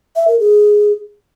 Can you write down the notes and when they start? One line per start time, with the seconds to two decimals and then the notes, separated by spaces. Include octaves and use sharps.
0.16 E5
0.28 A#4
0.39 G#4